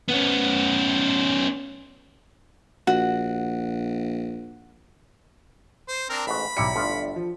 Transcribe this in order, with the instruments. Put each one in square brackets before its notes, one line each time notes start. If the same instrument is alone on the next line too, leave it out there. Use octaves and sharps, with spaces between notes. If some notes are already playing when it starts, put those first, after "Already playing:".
[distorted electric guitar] B3 C#4
[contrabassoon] A#1 [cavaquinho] F#4
[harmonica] C5
C4 D4 A#4
[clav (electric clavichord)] A1 G#2 F#4 [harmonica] B5
[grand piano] B1 A#5 C#7 [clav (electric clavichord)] G3 E4
[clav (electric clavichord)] G1 A2 F4 [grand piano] D4
[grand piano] F3